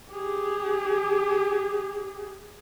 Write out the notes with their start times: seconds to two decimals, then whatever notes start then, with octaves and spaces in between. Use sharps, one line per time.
0.11 G4 G#4